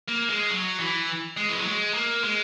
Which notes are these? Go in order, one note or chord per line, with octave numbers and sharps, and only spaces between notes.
A#3
G#3
F#3
E3
G#3
E3
F#3
G#3
A#3
G#3